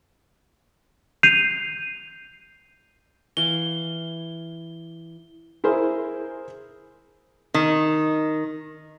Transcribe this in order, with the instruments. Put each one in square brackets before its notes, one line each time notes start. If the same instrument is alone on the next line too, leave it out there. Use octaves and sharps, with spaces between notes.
[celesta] G6 C7 D#7 F7
[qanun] E3 F5 [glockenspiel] G7
[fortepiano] E4 G#4 A#4 C5
[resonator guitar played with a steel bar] D#3